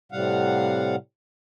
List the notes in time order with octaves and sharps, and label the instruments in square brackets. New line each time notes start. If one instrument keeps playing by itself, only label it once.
[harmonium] A2 C3 G3 F5 F#5